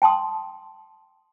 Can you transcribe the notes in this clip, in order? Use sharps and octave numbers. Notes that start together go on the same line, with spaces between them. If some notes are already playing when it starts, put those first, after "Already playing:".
G5 A5 C6 D#6